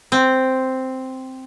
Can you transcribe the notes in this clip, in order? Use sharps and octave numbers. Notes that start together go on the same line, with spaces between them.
C4